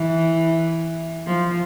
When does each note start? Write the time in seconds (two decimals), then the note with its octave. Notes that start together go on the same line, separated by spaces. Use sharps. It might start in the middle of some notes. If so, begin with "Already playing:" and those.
Already playing: E3
1.27 F3